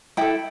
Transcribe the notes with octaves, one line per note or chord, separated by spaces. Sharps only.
E4 A4 G5